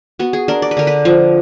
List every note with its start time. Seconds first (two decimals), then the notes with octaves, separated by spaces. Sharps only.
0.19 B3 F#4
0.33 G#4
0.48 D4 A#4
0.62 D5
0.71 B4
0.77 D3 A#4
0.87 B4
1.05 F3